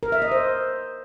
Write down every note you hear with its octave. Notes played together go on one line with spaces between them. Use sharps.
A#4
E5
D#5
C5